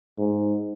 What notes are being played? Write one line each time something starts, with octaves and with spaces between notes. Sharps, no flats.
G#2